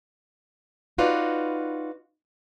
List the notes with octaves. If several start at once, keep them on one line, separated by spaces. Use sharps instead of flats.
D#4 F4 F#4 B4 D5